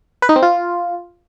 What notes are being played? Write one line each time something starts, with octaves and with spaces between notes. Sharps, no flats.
B4
D#4
C4
F4